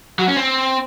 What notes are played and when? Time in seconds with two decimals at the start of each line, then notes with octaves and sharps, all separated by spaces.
0.19 F#3
0.28 C#4
0.37 C4